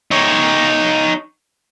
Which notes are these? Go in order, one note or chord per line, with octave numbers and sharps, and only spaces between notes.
D#4 C#5